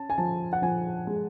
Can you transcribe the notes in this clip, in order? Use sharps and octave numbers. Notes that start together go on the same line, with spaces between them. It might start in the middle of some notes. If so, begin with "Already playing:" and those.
Already playing: C#4 A5
G#5
F3 A5
F#5
F3 G#5
G#3